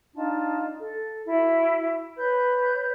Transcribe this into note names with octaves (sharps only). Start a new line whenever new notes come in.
D4 D#4 F4 A5
A4
E4 F#4
B4 C#5 G6